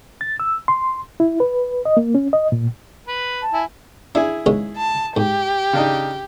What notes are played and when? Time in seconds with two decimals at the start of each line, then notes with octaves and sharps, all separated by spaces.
0.21 A6
0.40 E6
0.68 C6
1.20 E4
1.40 B4
1.85 D#5
1.97 A#3
2.15 C#4
2.33 D#5
2.52 A#2
3.08 B4
3.41 A5
3.54 E4 G#5
4.15 D4 E4 G#4
4.46 D#2 C#3 G#3
4.77 A5
5.17 G#2 G4
5.73 C#3 D4 D#4